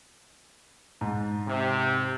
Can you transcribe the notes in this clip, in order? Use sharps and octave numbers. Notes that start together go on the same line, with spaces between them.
G#2
C3